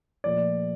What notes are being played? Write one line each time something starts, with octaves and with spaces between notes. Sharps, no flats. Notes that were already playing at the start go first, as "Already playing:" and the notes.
A#2 F3 A3 D5